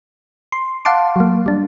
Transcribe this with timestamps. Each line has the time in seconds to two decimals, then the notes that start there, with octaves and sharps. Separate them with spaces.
0.52 C6
0.85 F5 F#5 A5 C6 D6
1.16 F#3 A#3
1.46 G3 D4